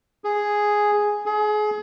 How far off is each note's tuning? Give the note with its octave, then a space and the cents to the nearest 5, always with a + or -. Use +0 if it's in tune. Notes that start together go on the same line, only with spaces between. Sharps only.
G#4 +0
G#4 +30